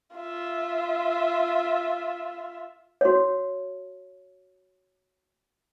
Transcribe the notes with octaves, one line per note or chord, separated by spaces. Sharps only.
F4 E5
F#4 C#5